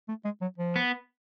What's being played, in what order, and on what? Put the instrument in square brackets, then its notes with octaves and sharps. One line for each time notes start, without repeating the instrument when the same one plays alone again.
[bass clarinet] A3
G#3
F#3
F3
[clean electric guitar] B3